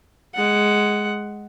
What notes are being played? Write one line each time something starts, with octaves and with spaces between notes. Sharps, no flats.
G#3 F#5